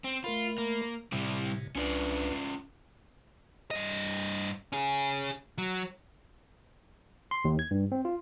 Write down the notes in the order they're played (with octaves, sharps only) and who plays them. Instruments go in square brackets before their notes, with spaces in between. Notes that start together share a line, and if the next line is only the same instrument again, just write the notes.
[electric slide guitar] C4
[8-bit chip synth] A3 A#4 B5 [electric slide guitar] F4
[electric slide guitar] A#3
[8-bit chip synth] A2 C3 [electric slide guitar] G3 C4 E4
[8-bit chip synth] C2 D4 B4 [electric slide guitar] C#4 F4 D5
[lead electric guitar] G2 D#5
C#4 G#4
F#3
[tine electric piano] C6
D#2
G#6
G2
C4
F4